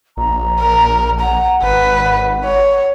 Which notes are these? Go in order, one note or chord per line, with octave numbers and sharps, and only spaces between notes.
A#1 A#5
A#4
F#5 A#5
G#1 B4
C#5